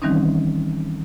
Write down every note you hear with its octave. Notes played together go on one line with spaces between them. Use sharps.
D#3 E3 G3 C4 C#4 D#4